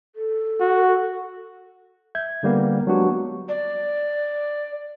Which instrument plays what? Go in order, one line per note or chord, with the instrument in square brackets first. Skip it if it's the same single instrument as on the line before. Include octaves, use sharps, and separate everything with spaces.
[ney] A4
[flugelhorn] F#4
[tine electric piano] E5 G6 G#6
D3 G3 A#3 B3
F#3 G#3 B3 D4 F#4 G4
[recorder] D5